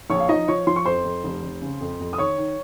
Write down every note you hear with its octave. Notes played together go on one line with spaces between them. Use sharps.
A#1 C#5 C#6
F5
F3 D#4 D#5
F3 C#5 C#6
F3 C6
C#6
F2 C5 C6
F2
F1
F1
C#3
F2
F2
D#6
D#3 C#5 C#6
D#3